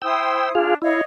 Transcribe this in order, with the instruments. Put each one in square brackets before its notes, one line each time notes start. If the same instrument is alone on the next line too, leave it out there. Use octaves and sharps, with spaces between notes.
[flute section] E4 C5 D#6 [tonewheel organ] G5 E6
[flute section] D4 [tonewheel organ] F4 G#4 F5
[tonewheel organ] E4 [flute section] C#5 D#5 F5